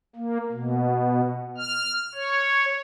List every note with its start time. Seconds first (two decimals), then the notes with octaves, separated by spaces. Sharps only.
0.16 A#3
0.52 B2
1.58 F6
2.14 C#5